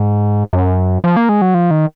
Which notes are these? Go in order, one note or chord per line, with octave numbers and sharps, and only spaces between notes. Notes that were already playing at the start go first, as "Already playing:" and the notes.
Already playing: G#2
F#2
F3
A#3
G#3
F#3
F3
D#3